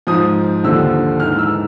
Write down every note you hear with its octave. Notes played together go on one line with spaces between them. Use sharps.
G#2 F3 D#6
D#2 D3 F3 E6
G#2 E3 F6
E6